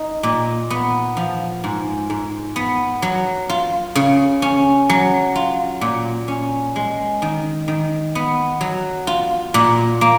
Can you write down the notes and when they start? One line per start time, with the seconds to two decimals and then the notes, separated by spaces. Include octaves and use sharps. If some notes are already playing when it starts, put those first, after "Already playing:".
Already playing: D#4
0.23 A#2
0.70 B3
1.17 F3
1.64 G#2
2.10 G#2
2.56 B3
3.02 F#3
3.49 F4
3.95 C#3
4.42 C#4
4.90 F#3
5.36 F4
5.81 A#2
6.28 C#4
6.76 G#3
7.22 D#3
7.68 D#3
8.15 B3
8.61 F#3
9.07 F4
9.54 A#2
10.01 A#3